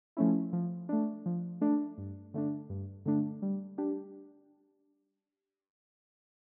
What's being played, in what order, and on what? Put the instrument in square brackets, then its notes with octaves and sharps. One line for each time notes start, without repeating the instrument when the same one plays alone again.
[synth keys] F3 A3 C#4 E4
F3
A3 D4
F3
A3 D4
G2
D3 A3 D4
G2
D3 A3 D4
G3
D4 G4